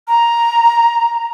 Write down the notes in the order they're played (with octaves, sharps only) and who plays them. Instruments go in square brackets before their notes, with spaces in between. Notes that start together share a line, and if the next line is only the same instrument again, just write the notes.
[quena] A#5